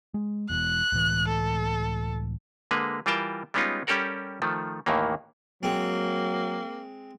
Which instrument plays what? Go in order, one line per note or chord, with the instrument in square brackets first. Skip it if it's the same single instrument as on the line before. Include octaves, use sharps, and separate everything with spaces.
[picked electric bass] G#3
[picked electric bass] E1 A#1 E2 [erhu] F#6
[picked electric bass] C#2 A2 E3
[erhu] A4
[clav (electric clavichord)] D3 G#3 A#3 B4
E3 G3 F4 A#4 G5 A5
G3 G#3 B3 C#4 D#4 F4
G3 C#4 G4 A4 A#4 F#5
D#3 F3 A3
D#2 A2 D#3 E3 A#3
[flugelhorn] F#3 [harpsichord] G#3 C4 [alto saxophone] A#3